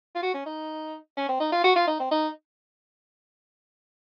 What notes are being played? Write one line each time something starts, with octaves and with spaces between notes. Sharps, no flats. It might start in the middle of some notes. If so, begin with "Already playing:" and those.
F4
F#4
C#4
D#4
C#4
C4
D#4
F4
F#4
F4
D#4
C4
D#4